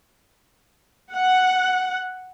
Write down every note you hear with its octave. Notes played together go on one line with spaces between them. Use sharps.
F#5